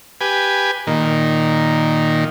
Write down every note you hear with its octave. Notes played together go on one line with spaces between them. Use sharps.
G4 B4 G#5
A#2 D#3